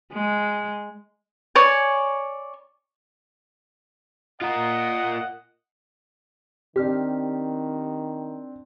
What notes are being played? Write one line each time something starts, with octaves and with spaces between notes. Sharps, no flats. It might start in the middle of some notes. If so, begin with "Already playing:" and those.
G#3
C#5 D5 G#5
F4 A#4 D#5 F#5
D#3 C4 D4 G4 F6